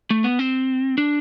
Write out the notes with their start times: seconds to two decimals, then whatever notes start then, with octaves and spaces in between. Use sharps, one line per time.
0.10 A3
0.24 B3
0.39 C4
0.98 D4